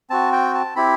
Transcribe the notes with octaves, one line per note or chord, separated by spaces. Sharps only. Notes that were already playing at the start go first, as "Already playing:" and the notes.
C4 F#4 A5
G5
A5
C4 E4 G4 B5